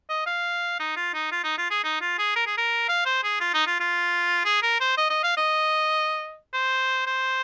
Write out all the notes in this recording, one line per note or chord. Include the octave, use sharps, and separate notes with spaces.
D#5
F5
D#4
F4
D#4
F4
D#4
F4
G#4
D#4
F4
G#4
A#4
G#4
A#4
F5
C5
G#4
F4
D#4
F4
F4
G#4
A#4
C5
D#5
D#5
F5
D#5
C5
C5